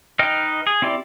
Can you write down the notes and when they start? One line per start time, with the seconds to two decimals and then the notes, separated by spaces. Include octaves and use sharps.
0.19 D#4 B4 D#5 G5 F6
0.67 G#4
0.82 C4 E4 G4 D5